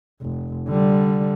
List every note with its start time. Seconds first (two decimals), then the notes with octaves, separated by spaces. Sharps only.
0.22 F1
0.68 D3 G3